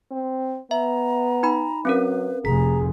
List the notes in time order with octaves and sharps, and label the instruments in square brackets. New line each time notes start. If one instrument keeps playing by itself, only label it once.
[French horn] C4
[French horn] B3 [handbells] E5 [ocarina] A#5
[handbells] D#4 B5
[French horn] F#3 [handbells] C4 C#4 A#4 [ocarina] B4
[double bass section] F1 [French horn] G#4 [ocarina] A#5 [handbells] B6